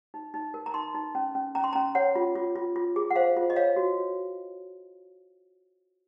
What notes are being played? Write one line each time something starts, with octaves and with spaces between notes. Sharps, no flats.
D#4
D#4
A#4
A#5
D#4 C6
D#4
C#4
C#4
C#4 A#5
C6
C#4 A#5
C#5 F#5
F4
F4
F4
F4
G#4
F#5
C5 F5
F4
D#5
C#5 F5
F#4